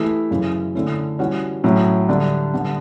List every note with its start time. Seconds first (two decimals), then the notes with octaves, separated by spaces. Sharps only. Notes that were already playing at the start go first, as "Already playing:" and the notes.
Already playing: E3 A3 E4 G4
0.31 F#2 C#3 E3
0.75 D3 A3 C#4 E4
1.19 E3 G3 C#4 F#4
1.64 A2 F#3 C#4
2.09 D3 G3 D4
2.54 D3 G3 B3